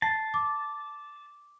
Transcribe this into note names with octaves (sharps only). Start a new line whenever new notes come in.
A5 C7
D6